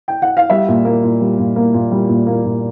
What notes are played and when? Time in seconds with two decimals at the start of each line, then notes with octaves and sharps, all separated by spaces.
0.08 G5
0.22 F#5
0.37 F5
0.50 G3 E5
0.68 A#2
0.85 A#3
1.03 A#2
1.21 G3
1.38 A#2
1.56 A#3
1.74 A#2
1.91 G3
2.08 A#2
2.27 A#3
2.45 A#2